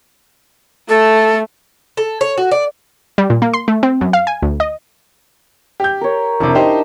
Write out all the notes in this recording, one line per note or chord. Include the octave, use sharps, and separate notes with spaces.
A3 A4
A4
C#5
F#4
D5
G3
A#2
A#3
C6
A3
C4
F#2
F5
G#5
D2
D#5
G4 G6
A#4 C#5
F1 C3 D4 E4 E5
D#4 G4 C5